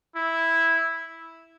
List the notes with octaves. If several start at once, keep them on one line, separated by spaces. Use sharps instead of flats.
E4